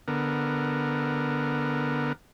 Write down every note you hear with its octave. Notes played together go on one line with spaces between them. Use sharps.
D3 B3 A#4